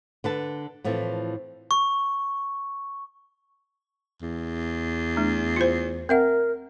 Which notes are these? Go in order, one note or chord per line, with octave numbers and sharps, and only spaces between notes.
D3 B4 A5
A2 E3 F3 A3 C4
C#6
E2
A3 D4
F4 C5
C4 A#4 E5 F#5